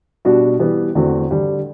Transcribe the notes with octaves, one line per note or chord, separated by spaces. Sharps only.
B2 G3 D4 F#4
E3 G3 B3
E2 D3 A3 C4 F#4
D3 G3 D4